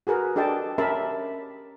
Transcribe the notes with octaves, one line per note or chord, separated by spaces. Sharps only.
F#4 G#4 A#4 B4
D4 G4 A4 D#5 G5 A5
C#4 G4 A#4 E5 A5 B5